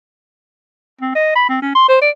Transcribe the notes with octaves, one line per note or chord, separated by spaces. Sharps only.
C4
D#5
B5
C4
C#4
C6
C5
D5